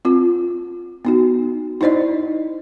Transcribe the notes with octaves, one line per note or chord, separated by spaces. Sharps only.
C4 F4
B3 D#4 F#4
D#4 E4 C5 D5 D#5